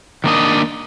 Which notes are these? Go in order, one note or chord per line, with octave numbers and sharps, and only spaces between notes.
D#3 A#3 D4 D#5